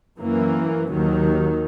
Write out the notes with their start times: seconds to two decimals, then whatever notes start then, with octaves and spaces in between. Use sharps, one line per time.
0.18 F#2 E3 A#3
0.89 D#2 D#3 F#3